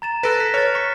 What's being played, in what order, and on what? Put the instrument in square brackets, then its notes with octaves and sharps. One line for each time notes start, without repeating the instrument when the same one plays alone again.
[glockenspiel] A#5 A6 E7
[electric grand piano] A4 B4 [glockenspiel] F#6 A#6 D7
[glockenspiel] B6
[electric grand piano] C#5 [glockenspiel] F6 A6
[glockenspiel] C#6 B6 C#7